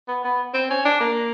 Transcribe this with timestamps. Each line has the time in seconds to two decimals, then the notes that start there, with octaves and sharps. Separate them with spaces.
0.08 B3
0.24 B3
0.54 C4
0.70 C#4
0.85 D4
1.01 A#3